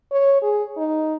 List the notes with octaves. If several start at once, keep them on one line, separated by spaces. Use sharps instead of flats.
C#5
G#4
D#4